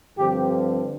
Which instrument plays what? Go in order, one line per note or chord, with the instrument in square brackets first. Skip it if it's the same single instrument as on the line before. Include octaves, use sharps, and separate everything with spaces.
[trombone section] G2 D3 F3 C4 G4